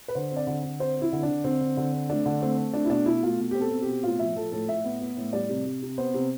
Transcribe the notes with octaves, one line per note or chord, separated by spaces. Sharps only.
B4
D3 C5
C4
D5
D3
D3
C4 C5
C4
E4
D3
D4
D3
D3 C4
D3
D3
C4
A3 D4
D3
A3 C4
C4
A3 D4
E4
B2 D4
B2 E4
A3 F4
B2
C4 G4
A4
C4
B2 G4
A2 F4
F3 E5
F3 A4
A2 A4
A2 E5
B3
B3
A2
G3 D5
C3
C3
C3
B3 C5
C3